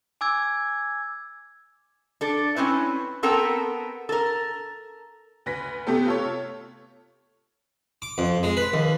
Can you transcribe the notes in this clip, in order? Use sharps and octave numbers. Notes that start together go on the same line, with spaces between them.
G#5 D6 E6 G#6
D4 A4
C4 C#4 E4 B4
B3 C4 A4 A#4 G5
A4 A#4
D2 B4 A#6 B6
C3 A3 B3 G4 A4
F4 A4 C#5
D6
F2
G#3
B4
D#2